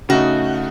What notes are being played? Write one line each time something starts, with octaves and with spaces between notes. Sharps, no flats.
C#3 A3 D#4 F#4